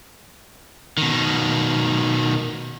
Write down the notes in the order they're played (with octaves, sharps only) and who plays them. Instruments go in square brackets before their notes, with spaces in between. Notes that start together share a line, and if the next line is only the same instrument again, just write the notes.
[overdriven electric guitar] B2 D#3